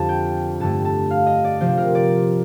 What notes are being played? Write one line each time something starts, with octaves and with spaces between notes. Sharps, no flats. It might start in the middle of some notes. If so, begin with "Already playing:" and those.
Already playing: F2 D3 G3 A5
G5
G2 D3 A3 A5
A5
F5
D#5
D5
C3 F3 C4 C5
A#4
D5